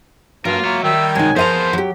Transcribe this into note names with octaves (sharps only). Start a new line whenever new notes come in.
G2 F#3 A#3 F4 A#4
A#3 C#5 E5
D#3 G3 E5
C2 F#3 G#3 D#4 G#5
F3 B3 G#4 A#4 C5 E5 A#5
F#3 G4